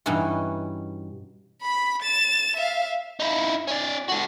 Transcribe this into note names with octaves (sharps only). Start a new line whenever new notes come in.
G2 B2 E3 C#4 D#4 F#4
B5 B6
A6 E7
E5 F5
D#4 E4
C#4 D5
F#4 A4